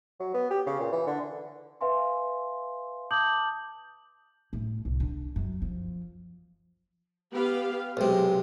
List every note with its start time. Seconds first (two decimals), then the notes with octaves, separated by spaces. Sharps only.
0.20 F#3
0.34 B3
0.51 G4
0.67 C#3
0.80 A#2
0.92 E3
1.07 D3
1.81 B4 E5 F5 G#5 C6
3.11 A5 D6 D#6 G6 F#7
4.53 A2
4.85 C2
5.00 D3
5.36 F#2
5.62 F3
7.33 B3 G4 F5
7.97 B1 C3 G#3